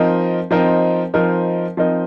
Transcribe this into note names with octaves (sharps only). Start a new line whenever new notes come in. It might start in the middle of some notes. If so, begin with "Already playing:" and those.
Already playing: F3 C4 D#4 A#4 D#5
F3 C4 D#4 A#4 D#5
F3 C4 D#4 A#4 D#5
F3 C4 D#4 A#4 D#5